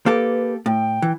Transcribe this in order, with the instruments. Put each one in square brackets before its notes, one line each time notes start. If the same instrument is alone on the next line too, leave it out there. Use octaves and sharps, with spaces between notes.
[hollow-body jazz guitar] A#3 G4 A4 [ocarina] B4
[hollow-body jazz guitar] A2 [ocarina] G5
[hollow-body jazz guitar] E3